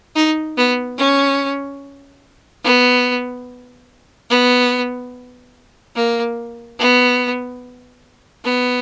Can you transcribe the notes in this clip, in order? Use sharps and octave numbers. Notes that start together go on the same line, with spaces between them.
D#4
B3
C#4
B3
B3
A#3
B3
B3